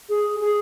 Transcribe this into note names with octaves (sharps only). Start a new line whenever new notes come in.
G#4
G#4